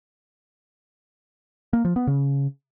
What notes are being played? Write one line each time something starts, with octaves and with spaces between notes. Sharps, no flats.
A#3
F3
B3
C#3